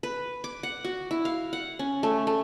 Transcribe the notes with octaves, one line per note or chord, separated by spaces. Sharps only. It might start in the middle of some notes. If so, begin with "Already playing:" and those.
B4
D6
F#5
F#4
E4
F5
F#5
C#4
A3
A3